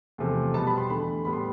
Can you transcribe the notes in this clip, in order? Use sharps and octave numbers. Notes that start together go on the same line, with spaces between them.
E2 C3 F3 A3
B2 G3 B3 A5
B5
C6
E2 D3 A3 B5
A2 G3 B3 B5
C6